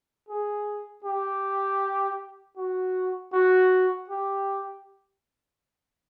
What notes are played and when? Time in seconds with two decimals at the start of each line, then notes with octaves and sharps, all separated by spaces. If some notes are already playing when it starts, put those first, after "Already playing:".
0.29 G#4
1.04 G4
2.57 F#4
3.33 F#4
4.09 G4